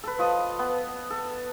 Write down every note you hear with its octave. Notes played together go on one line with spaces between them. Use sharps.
A4 B4
F3 D#5 D#6
B3
A4